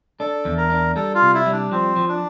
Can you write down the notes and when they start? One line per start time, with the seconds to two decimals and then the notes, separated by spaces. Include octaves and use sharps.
0.20 D4 A4
0.45 E2
0.58 A#4
0.70 D4
0.96 G3 A4
1.14 F4
1.22 C3
1.34 E4
1.46 G3
1.52 D4
1.71 F3 C4
1.96 F3
2.09 D4